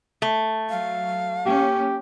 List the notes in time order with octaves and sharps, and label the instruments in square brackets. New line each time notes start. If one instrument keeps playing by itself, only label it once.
[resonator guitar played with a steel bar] A3
[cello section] F#3 [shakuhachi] F5
[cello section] A#3 C#4 [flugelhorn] G4